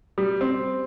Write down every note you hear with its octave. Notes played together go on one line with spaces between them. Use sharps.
G3
C4